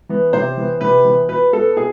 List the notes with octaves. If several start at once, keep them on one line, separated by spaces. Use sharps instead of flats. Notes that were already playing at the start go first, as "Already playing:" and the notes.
E3 B3
C3 C5
E3 B3
C3 B4
E3 B3
B2 B4
B3 A4
B2 G#4